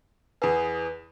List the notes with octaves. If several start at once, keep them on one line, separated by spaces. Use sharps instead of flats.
E2 G#4 B4